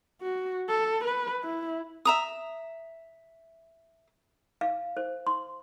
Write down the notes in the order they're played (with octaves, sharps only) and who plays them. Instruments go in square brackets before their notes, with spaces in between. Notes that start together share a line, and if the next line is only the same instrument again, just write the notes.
[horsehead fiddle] F#4
A4
B4
E4
[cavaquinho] E5 A#5 D#6
[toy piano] F5
C5
C6